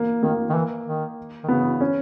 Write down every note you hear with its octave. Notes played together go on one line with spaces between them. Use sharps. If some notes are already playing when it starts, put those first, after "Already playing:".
Already playing: A#3
D#3 A#3
D#3
E3
D#3
D#3
C#3 B3
C#4